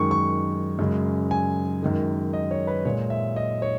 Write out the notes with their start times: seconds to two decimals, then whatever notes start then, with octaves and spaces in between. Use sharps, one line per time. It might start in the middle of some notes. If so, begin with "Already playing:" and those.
Already playing: F#2 D#3 G#3 C#6
0.11 C#6
0.79 F#2 C#3 G#3
1.31 G#5
1.83 F#2 D#3 G#3
2.33 D#5
2.51 C#5
2.67 B4
2.85 A#2 G#3 C#5
3.10 E5
3.36 D#5
3.62 C#5